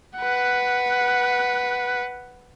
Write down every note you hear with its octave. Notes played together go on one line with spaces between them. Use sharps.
B4 F#5